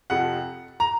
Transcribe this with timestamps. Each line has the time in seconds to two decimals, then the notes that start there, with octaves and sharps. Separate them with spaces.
0.10 F2 C3 F3 F#5
0.80 A#5